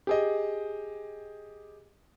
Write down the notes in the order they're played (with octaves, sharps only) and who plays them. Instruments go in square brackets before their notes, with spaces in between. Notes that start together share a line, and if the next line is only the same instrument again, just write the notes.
[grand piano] G4 G#4 D#5